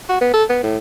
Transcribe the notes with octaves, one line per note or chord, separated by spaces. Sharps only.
F#4
B3
A4
B3
A2